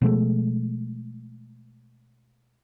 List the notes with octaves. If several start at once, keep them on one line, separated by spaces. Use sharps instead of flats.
B2 F3 G#3 A3